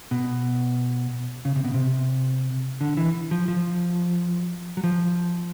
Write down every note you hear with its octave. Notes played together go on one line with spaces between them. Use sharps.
B2
C#3
C3
B2
C3
D3
E3
F3
F3
F#3
F3